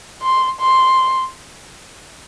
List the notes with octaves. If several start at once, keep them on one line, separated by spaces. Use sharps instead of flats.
C6
C6